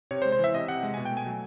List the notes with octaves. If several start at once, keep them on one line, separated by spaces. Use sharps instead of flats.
C3 C#5
C5
G#3
C5
E3 E5
C3 D#5
C3 F#5
G#3
B2 G#5
G5
A3
G#5
F#3